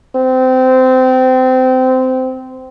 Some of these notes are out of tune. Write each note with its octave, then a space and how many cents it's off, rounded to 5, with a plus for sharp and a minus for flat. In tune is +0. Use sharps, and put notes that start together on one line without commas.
C4 -20